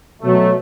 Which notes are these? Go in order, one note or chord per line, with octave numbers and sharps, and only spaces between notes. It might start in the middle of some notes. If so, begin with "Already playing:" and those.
B2 F#3 A3